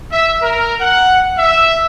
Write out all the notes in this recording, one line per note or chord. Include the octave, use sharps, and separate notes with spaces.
E5
A#4
F#5
E5